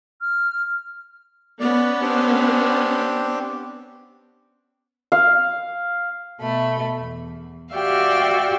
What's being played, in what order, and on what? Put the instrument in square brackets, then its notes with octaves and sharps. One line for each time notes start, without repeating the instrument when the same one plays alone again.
[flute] F6
[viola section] B3 C#4 [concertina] D5
[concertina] C4 D4 G4
[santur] F5
[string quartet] B2 A3 B5
E2
F#4 G4 D5 E5 F5 G5